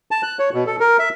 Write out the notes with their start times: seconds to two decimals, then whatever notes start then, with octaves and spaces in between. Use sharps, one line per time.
0.11 A5
0.23 F#6
0.39 C#5
0.53 B2
0.67 A4
0.80 A#4
0.99 E5